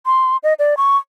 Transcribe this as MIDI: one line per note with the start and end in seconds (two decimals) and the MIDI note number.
0.06 0.37 84
0.43 0.54 75
0.59 0.74 74
0.77 0.97 85